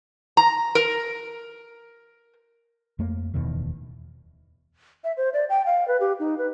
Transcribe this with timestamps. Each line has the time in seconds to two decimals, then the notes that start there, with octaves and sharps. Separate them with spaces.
0.37 A#5
0.75 A#4
2.99 F2 A3 A#3
3.34 D1 E2 B2 D#3
5.04 E5
5.17 C5
5.34 D5
5.49 G5
5.66 F5
5.88 B4
6.00 G4
6.20 D#4
6.38 B4